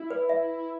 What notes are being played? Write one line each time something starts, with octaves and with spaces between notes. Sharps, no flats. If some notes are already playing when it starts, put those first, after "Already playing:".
Already playing: E4
B4
E5